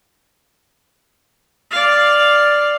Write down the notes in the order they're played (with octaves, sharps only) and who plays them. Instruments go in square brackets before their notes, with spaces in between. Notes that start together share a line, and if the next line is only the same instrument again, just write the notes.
[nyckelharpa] D5 F5